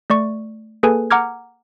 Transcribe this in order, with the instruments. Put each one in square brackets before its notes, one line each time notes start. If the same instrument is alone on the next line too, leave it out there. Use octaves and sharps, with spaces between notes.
[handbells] A3 D5 C#6
A#3 G#4 A4 B4 G#5
F#5 A#5 D6 F6 G#6